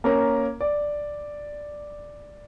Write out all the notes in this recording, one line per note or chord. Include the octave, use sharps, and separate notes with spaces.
A#3 C#4 A#4
D5